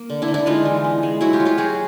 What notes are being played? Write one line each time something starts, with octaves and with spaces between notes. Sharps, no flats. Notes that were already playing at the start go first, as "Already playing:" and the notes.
Already playing: A#3
D3
D4 E4
D3
D4 E4
G#3 D#4 F4
E3
B3
G#3
F#3 E4 F#4
F4 G4
F#3
F4 G4
F#3 F#4 G#4